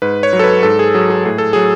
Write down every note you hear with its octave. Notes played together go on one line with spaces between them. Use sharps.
G#2 B4
C#5
F#3
A4
B4
G#2 A4
G#4
F#3 G#4
G#4
A2 G#4
A4
F#3 G#4